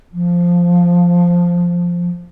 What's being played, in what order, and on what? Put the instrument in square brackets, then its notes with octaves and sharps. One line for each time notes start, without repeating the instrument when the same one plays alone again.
[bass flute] F3